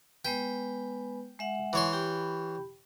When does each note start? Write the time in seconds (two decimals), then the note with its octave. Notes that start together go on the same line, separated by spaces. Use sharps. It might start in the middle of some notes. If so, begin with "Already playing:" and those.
0.25 G#3 B3 B4 G5
1.39 G#3 E5 F#5
1.73 E3 C#5 C6
1.93 G4 G5 B5